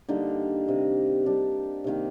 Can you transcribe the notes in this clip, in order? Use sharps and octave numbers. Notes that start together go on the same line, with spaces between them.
D3 G3 A#3 D#4
C3 D#3 A#3
G3 D4 G4
C3 D#3 A#3